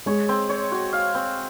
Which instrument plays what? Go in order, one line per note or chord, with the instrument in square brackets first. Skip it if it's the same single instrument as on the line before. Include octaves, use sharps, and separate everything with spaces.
[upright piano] G#3 [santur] C#5
[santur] C4
C#5
F#4
F5
C4